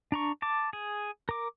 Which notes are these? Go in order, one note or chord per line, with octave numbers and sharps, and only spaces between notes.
D4 A#5 C#6
A5 D6
G#4
A#4 D6